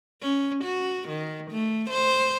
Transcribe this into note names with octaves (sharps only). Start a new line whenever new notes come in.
C#4
F#4
D#3
A3
C5